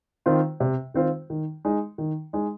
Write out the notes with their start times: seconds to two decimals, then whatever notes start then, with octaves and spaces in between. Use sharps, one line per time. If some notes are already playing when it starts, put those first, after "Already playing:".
0.26 D#3 C4 F4 C5
0.60 C3
0.94 D#3 C4 F4 C5
1.30 D#3
1.65 G#3 D#4
1.98 D#3
2.33 G#3 D#4